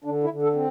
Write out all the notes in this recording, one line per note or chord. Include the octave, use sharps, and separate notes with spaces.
D3 D4
E4
D3
A4
C4